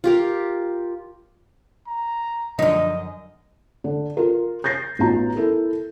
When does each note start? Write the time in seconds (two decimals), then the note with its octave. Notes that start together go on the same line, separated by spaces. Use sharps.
0.04 F4 G4 A#4
1.87 A#5
2.59 F#2 D3 F3 D4 D#4 D#5
3.84 D3
4.17 F4 A#4
4.64 G6 A6 A#6 C7
4.99 A1 B3 D#4 F4 F#4 A#5
5.36 E4 A4 A#4